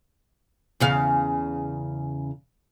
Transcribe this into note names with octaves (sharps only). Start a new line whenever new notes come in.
E2 C#3 F5